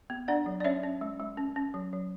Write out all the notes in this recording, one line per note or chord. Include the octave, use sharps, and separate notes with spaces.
B3
D4 D5 F#5
F#3
D5
C#4 C#5 E5
C#4
G#3
G#3
C#4
C#4
F#3
F#3